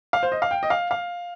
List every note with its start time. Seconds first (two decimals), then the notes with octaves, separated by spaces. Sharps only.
0.13 F5
0.23 C5
0.32 D#5
0.42 F5
0.51 G5
0.63 D#5
0.70 F5
0.91 F5